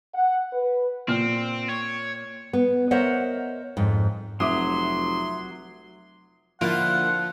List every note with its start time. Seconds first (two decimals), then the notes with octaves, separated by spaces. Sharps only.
0.15 F#5
0.53 B4
1.08 A#2 C4 F6
1.70 C#5
2.53 B3
2.91 A#4 C5 C#5 D#5 E5 F#5
3.77 F2 G#2
4.40 F1 F#3 E5 C6 D6 D#6
6.61 D3 F3 A#3 E4 F4 F#5